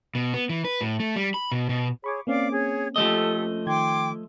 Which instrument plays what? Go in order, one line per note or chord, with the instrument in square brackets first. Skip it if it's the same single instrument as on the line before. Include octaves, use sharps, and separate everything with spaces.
[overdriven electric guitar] B2
B3
E3
B4
A2
A3
G3
B5
B2
B2
[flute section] G#4 C#5 [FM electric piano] B5 C#6 D6
[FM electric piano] A#3 C4 C#4 [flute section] D5 F5 D6
[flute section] G#4 C#5
[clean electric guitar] F3 A3 D#5 [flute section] G4 A4
[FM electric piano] D#3 G#6 [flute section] G5 C6 D6